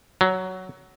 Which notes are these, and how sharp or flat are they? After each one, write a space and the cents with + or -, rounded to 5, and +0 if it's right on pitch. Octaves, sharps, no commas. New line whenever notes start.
F#3 +10